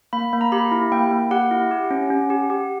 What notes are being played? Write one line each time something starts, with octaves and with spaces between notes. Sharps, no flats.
A#3 B5
A#3
A#5
G4 B5
E4
A#3 G5
A#3
G4 F#5
E4
G4
C#4
C#4
G4
G4